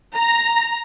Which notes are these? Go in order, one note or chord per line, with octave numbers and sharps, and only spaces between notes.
A#5